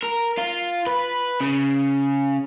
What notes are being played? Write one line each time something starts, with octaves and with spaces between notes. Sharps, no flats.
A#4
F4
B4
C#3